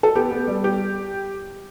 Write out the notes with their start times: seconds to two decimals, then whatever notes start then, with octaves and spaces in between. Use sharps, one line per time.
0.03 A4
0.15 B3 G4
0.31 B3
0.47 G3
0.64 G4